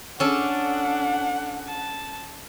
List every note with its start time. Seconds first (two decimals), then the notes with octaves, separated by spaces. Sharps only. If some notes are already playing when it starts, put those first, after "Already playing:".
0.20 C#4 D4 A4 D5 F#5
1.67 A5